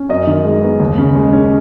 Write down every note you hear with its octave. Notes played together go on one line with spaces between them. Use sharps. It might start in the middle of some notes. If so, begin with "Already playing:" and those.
Already playing: C#4
F#2 D#5
D#3
G#3
B3
D#2
C#3
G#3
C#4